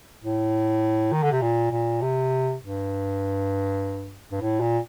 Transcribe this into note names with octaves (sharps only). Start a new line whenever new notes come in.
A2
D#3
D3
C3
A#2
A#2
C3
G2
G2
A2
A#2